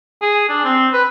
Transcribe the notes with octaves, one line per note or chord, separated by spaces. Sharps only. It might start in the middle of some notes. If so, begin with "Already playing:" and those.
G#4
D4
C4
B4